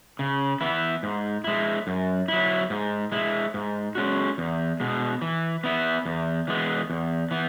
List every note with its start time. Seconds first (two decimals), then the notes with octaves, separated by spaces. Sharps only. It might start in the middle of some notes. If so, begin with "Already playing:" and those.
0.19 C#3
0.61 E3 B3 E4
1.03 G#2
1.44 G#3 E4
1.87 F#2
2.28 F#3 E4
2.70 G#2
3.12 G#3 E4
3.54 G#2
3.95 G#3 C#4 F#4
4.38 E2
4.80 B2 G#3
5.22 E3
5.64 B3 E4
6.05 E2
6.48 E3 G#3 B3
6.90 E2
7.31 E3 B3